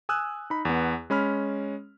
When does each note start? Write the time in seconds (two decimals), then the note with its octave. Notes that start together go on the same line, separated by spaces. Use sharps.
0.09 G#5 D#6 E6 F#6
0.50 D#4 B5
0.65 E2 B3
1.10 G#3 C#4 B5 F6